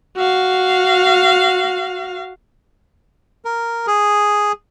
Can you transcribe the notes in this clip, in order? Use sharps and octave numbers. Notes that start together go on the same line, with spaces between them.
F#4 F5
A#4
G#4